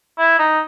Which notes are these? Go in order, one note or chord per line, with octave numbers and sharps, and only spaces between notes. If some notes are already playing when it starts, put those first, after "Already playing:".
E4
D#4